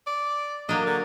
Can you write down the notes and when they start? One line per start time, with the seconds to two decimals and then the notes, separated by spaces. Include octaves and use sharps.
0.07 D5
0.69 F#3 A#3 D4 D#5
0.86 D3